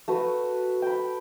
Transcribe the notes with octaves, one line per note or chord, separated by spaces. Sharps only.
A3 F#4 B4
G5 B5